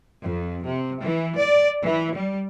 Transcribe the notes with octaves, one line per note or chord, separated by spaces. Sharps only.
F2
C3
E3
D5
E3
G3